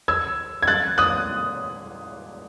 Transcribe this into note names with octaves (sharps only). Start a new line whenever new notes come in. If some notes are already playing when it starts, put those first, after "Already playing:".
E6 G#6
G#6
F#6 A6
D#6 F#6